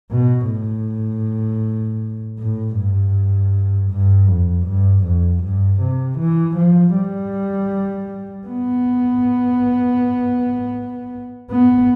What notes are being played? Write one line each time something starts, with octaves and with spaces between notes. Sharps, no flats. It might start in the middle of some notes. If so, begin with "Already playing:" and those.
B2
A2
A2
G2
G2
F2
G2
F2
G2
C3
E3
F3
G3
B3
B3